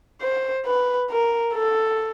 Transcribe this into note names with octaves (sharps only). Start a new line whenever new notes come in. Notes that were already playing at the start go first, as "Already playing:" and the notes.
C5
B4
A#4
A4